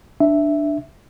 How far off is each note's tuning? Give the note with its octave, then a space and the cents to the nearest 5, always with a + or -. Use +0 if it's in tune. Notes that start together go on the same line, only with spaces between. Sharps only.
D4 +10 E5 +0